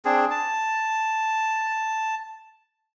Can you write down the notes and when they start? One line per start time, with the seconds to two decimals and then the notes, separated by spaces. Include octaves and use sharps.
0.05 C4 D4 G#4
0.31 A5